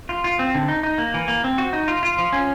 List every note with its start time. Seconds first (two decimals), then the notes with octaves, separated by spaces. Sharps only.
0.09 F4
0.24 F4
0.39 C4
0.55 D3
0.68 D#4
0.83 D#4
0.98 A#3
1.14 E3
1.28 A#3
1.44 C4
1.58 F#4
1.73 D#4
1.88 F4
2.03 F4
2.19 F3
2.33 C#4